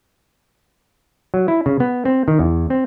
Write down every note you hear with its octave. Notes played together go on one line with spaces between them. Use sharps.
F#3
E4
C#3
B3
C4
D#3
E2
C4